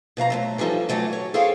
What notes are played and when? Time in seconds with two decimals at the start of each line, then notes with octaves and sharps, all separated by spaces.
0.17 B2 F3 F5 A#5
0.30 F#3 G#3 A3
0.58 E3 F3 G3 D#4 A4
0.89 E3 F#3 A3 D5
1.13 C#5
1.34 G#4 A4 C5 C#5 F5 G5